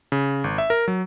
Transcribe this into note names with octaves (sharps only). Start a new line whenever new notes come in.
C#3
G#1
E5
A#4
F#3